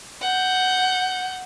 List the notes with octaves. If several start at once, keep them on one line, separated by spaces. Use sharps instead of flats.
F#5 G6